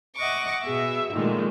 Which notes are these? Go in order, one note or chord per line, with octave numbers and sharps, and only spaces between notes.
D#5 E5 F#5 C#6 D6
B2 G#4 E5
A#2 D#3 F3 G#3 A3